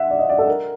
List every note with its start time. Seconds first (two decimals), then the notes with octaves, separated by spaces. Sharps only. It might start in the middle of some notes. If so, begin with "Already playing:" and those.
Already playing: E5 F#5
0.11 D5
0.19 D#5
0.29 D5
0.39 A4
0.47 A#4